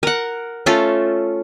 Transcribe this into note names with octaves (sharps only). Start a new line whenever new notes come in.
A#4 F#5
A3 C#4 F4 A4